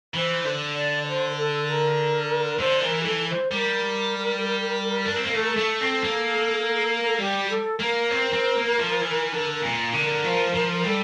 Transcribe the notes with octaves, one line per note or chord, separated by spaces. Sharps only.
E3 C5
D3
D5
C5
A#4
A4
A#4
D3 C5
E3 A#4
G4
E3 A4
C5
G3 A#4
D4
C4
A#3
A3 A4
A#4
A3 A4
C4
A#3
A#4
A4
G3 G4
A4
A#3 A#4
C4
C4
A#3
F3
E3
D3
A#2
D3 A#4
F3
F3
G3 A4